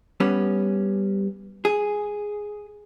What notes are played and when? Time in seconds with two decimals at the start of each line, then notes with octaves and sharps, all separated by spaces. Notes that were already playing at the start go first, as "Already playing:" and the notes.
0.20 G3 B3 C#4
1.65 G#4